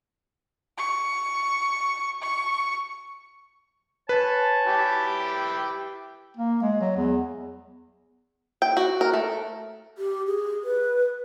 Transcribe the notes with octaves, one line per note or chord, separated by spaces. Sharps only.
C#6
C#6
B4 C#5 G#5 A5
E4 G4 G5
A#3
G#3
F#3
E2
G5
F#4
A#4
A3
G4
G#4
B4